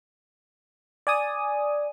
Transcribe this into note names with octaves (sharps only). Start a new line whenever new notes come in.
D5 G#5 D#6